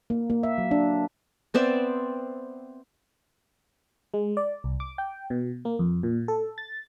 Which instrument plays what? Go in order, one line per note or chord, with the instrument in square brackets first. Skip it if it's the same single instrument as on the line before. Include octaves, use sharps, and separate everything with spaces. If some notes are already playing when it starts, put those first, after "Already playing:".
[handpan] A#3
A#3
E5
F#3
D4
[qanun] B3 C4 D5 E5
[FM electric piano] G#3
D5
C2
D6
G5
B2
A#3
F2
A#2
A4
A6